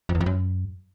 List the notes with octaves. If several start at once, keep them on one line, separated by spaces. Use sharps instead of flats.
F2
E2
F2
F#2